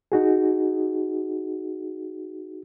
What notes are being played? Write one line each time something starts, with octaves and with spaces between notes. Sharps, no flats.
D#4 F#4 G#4